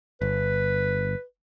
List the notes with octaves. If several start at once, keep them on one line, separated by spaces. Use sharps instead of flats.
G1 B4